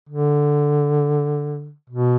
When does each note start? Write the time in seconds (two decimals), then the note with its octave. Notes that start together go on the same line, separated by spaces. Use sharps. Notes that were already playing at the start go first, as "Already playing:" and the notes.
0.09 D3
1.90 B2